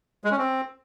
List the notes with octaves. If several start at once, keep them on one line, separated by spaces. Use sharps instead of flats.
G#3
C#4
C4